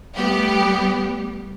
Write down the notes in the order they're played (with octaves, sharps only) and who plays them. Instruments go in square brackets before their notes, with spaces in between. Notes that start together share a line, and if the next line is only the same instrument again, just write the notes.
[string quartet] G3 [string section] A3 B3 G4